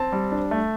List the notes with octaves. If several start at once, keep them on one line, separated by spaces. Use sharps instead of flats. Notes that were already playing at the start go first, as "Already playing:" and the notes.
Already playing: C4 A5
G3
D4
A3